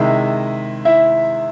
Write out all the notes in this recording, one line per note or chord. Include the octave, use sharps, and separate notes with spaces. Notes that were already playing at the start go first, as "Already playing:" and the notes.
Already playing: C3 D#3 G#3 E4 E5
E4 E5